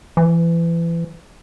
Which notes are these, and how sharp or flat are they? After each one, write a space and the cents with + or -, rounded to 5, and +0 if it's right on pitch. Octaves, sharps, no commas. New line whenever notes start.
E3 +30